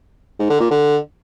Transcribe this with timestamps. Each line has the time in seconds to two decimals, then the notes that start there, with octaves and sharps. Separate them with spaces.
0.39 G#2
0.50 D3
0.60 A#2
0.71 D3